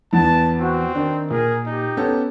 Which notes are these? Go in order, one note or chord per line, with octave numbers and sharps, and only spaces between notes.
E2 E3 B3 A5
C4 F#4
D#3 D4
A#2 G#4 A#4
D#4 G4
B3 C#4 A4